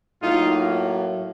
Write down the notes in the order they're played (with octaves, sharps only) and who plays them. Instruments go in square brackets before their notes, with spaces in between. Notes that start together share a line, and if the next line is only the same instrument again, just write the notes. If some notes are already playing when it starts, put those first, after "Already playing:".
[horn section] A2 F#3 A#3 D#4 F4